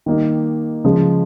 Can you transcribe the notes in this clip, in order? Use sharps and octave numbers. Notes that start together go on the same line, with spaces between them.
D#3 G3 A#3 D#4 G4
C#3 F3 G#3